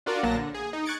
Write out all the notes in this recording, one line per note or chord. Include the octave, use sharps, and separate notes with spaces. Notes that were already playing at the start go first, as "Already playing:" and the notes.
D4 F4 F#4 A#4 D5
A#1 A#2 F#3 A#3 A5 A#6
D3
G#4
D#4
C#6 F#6 G#6 A6 C#7 D7